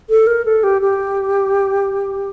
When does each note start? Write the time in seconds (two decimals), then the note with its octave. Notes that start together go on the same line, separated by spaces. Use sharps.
0.09 A4
0.27 A#4
0.45 A4
0.63 G4
0.82 G4